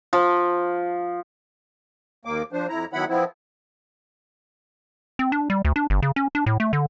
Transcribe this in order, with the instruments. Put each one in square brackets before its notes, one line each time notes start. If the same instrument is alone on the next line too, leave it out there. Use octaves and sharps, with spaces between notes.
[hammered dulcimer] F3
[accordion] D#2 A#3 D6
F3 D4 C5
F2 E4 A#5
D#3 F#3 B3 E4 F#5 B5
F3 B3 C4 E4
[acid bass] C4
D4
G3
D2
D4
G1
C#3
C#4
D4
A2
A3
D3